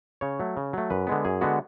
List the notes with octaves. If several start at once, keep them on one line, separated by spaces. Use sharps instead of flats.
C#3 C#5
F#3 A3
C#3
F#3 A3
F#2 B4
D3 G#3 B3
F#2 G#4
D3 G#3 B3 F#4